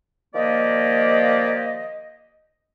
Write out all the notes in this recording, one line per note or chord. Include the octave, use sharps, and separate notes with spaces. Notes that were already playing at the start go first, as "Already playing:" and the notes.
D#3 F3 A#3 G4 D5 D#5